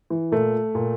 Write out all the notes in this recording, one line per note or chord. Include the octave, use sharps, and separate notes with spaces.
E3
A#2 A3
A#2